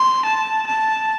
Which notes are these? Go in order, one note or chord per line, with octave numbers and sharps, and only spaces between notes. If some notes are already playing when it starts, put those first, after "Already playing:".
Already playing: C6
A5
A5